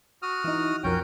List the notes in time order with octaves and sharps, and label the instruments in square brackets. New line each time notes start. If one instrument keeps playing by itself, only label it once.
[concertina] F#4 D#6 F6
[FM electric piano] E3 D#4
[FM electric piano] B1 F2 A#4 [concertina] C#4 F#4 G5